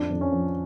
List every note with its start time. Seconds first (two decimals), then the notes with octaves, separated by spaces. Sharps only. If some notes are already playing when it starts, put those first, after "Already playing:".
Already playing: F2 D4
0.10 F2
0.21 C#4
0.32 F3